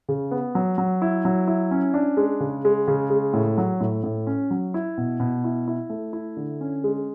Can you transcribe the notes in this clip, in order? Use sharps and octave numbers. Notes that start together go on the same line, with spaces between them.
C#3
B3
F#3
F#3
E4
F#3
E4
C#4
D4
G#3
C#3
G#3
C#3
G#3
A2
F#3
A2
A2
C#4
F#3
E4
B2
B2
E4
E4
A3
E4
D3
C#4
G#3